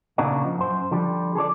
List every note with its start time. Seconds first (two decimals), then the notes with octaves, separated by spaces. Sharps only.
0.18 A#2 C#3 A#3 D4 D#4 F#4
0.44 F3
0.58 F#2 C5
0.91 D3 F3 G3
1.35 G#4 A4 C#5 D5